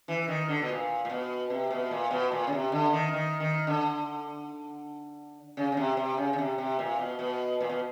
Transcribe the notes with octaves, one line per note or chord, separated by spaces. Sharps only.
E3
D#3
D3
B2
A#2
A#2
B2
C3
B2
A#2
B2
A#2
C#3
C3
D3
D#3
D#3
D#3
D3
C#3
C#3
C3
C3
C#3
C#3
C3
C3
A#2
B2
B2
A#2
B2